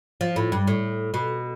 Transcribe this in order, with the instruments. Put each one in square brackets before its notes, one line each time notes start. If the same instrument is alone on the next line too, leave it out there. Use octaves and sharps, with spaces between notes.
[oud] F3
A2
G2
A2
B2